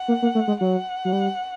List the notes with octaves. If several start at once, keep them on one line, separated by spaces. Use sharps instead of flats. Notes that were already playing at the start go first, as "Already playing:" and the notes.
Already playing: F#5
A#3
A#3
A3
G#3
F#3 F#5
F#3
G3